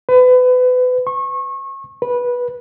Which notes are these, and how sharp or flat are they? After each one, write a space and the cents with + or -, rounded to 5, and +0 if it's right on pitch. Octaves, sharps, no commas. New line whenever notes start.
B4 +30
C#6 -30
B4 -15